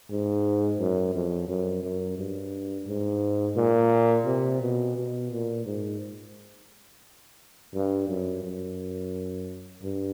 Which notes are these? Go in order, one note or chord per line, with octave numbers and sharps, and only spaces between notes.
G#2
F#2
F2
F#2
F#2
G2
G#2
A#2
C3
B2
B2
A#2
G#2
G2
F#2
F#2
G2